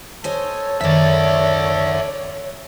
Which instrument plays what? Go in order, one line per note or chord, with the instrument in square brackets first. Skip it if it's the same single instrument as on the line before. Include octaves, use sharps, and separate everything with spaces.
[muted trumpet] A4 [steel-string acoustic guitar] C5 D#5 G#5 [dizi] C#5
[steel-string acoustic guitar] F#2 D#3 [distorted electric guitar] D5 E5